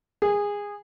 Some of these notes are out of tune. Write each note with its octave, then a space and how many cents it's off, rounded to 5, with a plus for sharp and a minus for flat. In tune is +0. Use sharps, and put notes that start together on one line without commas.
G#4 -20